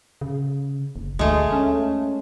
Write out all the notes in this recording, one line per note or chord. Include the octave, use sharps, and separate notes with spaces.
C#3
F#1
D2 G#3 A3
C#4